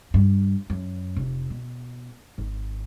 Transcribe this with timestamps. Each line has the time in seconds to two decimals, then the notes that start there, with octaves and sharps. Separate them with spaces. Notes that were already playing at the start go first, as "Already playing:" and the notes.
0.14 G2
0.70 F#2
1.16 F1
1.50 B2
2.38 G#1